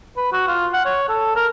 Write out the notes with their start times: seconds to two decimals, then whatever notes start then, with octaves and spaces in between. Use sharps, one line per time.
0.17 B4
0.33 F#4
0.48 F4
0.73 F#5
0.85 C#5
1.09 A4
1.36 A#4